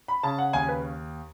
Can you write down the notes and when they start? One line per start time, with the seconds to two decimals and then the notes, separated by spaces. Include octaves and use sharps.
0.08 B5
0.23 C#3 A5
0.38 F#5
0.53 D#2 G#5
0.69 B4